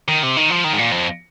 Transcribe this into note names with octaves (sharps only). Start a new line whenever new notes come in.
D#3
C3
D#3
F3
D#3
G#2
A#2
F2